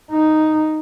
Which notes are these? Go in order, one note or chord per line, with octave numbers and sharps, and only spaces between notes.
D#4